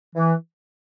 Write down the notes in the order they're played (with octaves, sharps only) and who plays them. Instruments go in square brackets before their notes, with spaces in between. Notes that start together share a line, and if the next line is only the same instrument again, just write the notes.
[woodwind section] E3